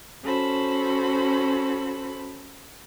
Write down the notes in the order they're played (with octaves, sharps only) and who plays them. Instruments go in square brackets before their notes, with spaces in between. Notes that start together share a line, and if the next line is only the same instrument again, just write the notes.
[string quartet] C#4 F#4 A4 C5 B5